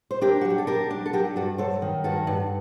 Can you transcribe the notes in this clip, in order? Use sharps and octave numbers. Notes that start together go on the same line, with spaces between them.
C5
D4 G4 A#4
F#4
F#3
G4
A4
D4 G4 A#4
D4
A4
F#3 G4 A#4
G2 F#4 A4
F#3 A4 C5
D#3
G2 F#4 A4
G2